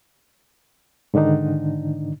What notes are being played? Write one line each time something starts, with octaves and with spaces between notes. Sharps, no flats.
G#2 D3 D#3 D4 D#4